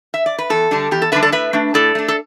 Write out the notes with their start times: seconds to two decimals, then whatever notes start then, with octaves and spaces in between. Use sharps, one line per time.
0.14 E5
0.26 D5
0.38 B4
0.50 E2 A4
0.71 D3 G3 D4
0.91 E2 G4
1.02 A4
1.12 D3 G3 D4 B4 E5
1.22 A4 D5
1.32 A2 B4 E5
1.53 A3 D4
1.74 A2 A4 D5
1.95 A3 D4
2.08 A4